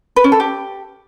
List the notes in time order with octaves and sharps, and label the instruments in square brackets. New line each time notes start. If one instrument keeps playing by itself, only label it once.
[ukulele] B4
C#4
A4
G4